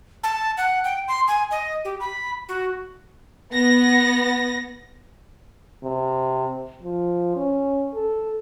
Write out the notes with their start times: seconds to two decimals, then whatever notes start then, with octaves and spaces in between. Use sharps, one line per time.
0.23 A5
0.57 F#5
0.84 G5
1.08 C6
1.28 G#5
1.51 D#5
1.85 G4
2.00 B5
2.49 F#4
3.51 B3 A#6
5.84 C3
6.83 F3
7.36 C#4
7.95 A4